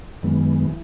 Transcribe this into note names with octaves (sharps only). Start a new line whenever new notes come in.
F#2 D#3 G#3 B3
E3